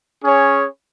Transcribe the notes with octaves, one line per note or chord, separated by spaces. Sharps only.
C#4 G#4 C#5